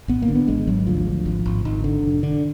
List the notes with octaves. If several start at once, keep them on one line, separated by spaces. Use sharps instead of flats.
G#1 B3
A#3
D3
B3
G#1 G#3
G#1 F#3
D2 F3
D2
G#1
G#1
G#1 D#3
D3
F1
D3